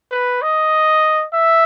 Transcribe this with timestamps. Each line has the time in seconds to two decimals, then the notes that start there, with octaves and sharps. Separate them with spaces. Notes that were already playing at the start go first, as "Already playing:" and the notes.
0.11 B4
0.42 D#5
1.34 E5